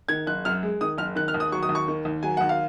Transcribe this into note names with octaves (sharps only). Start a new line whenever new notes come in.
D#3 G#6
F#1 F#6
F#2 F6
G#3
D#3 D#6
F#1 F6
D#3 F#6
F6
D#2
D#6
F#3 C#6
D#6
D#2
C#6
D#3
D#2
F#3 G#5
D#2 F#5
F5